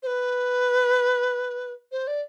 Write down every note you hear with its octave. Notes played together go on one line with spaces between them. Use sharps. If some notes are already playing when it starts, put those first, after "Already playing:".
C5
B4
C5
D5